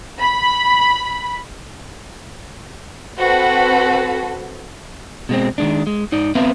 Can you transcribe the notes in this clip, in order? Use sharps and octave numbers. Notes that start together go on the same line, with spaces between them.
B5
C4 F#4 A4 B4
B2 G#3 C4
D#3 G#3 D4
G#3
G#2 D#4 D5
B3 C4 B4 E5 F5